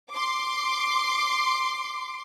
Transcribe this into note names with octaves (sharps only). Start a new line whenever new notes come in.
C6 D6